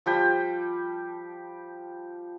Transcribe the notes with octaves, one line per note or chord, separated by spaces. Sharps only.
F3 G3 G5